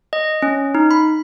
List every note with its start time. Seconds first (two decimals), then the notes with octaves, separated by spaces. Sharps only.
0.13 D#5
0.42 C#4
0.75 D#4
0.91 B5